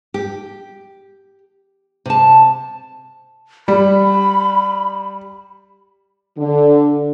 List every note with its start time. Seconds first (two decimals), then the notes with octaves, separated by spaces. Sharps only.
0.14 G4
2.06 C3 A5
3.68 G3 B5
6.38 D3